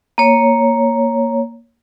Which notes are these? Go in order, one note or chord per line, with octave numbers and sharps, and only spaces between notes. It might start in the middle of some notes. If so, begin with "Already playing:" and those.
A#3 C#5